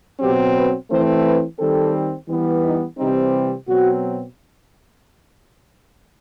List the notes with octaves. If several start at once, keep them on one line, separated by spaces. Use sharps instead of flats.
B2 F#3 C4 G4
B4
E3 A3 C4 C5
B4
D#3 G3 C4 A4
E3 G3 B3
D#4
C3 E3 G3 C4 D#4
B2 F#3 C4 F#4